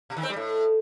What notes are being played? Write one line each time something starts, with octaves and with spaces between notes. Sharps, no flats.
B2
D#3
C4
G3
A2